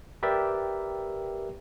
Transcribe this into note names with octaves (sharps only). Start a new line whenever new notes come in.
G4 A#4 B4 D5 E5 G5